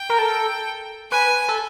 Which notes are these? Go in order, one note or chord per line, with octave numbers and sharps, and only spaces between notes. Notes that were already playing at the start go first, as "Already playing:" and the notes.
Already playing: G5
A#4
A4
B4 G#5
A4